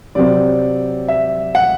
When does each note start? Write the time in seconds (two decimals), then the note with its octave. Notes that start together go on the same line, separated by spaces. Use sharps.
0.15 C3 F#3 C4 D5
1.08 E5
1.55 F#5